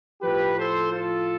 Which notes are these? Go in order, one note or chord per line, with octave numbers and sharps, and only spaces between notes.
A2 F3 G4 B4
A4 C5
F4 A4